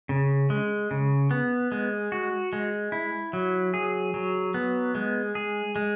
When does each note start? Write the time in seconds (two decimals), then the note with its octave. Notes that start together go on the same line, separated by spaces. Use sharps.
0.09 C#3
0.50 G#3
0.91 C#3
1.31 B3
1.72 G#3
2.12 F#4
2.53 G#3
2.92 E4
3.33 F#3
3.74 G#4
4.14 F#3
4.54 B3
4.95 G#3
5.35 G#4
5.76 G#3